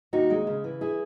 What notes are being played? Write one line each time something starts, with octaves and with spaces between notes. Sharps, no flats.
D#2 D#4 F#4
G#3
C#3
E3
E4 G#4